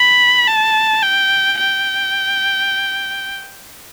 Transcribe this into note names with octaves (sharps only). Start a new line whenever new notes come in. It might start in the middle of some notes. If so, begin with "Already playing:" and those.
Already playing: B5
A5
G5
G5